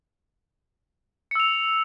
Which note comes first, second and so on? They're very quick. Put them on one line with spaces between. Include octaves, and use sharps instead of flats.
C#7 E6 F7